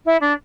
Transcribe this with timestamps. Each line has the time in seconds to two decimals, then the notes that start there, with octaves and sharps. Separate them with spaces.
0.06 E4
0.21 D4